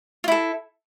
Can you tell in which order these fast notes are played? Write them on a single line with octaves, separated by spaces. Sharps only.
F4 E4 A4